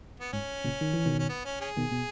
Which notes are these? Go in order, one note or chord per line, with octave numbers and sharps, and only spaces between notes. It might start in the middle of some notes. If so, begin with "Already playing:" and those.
B3
G#2 C#4
A#2 C#3
D#3
E3
B2 D#3
C#4
B3
C#4
C#4 G#4
B2 D#3
B2